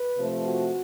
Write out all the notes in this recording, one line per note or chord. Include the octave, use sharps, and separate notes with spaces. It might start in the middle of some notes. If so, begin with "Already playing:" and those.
Already playing: B4
C3 F3 A3
F#4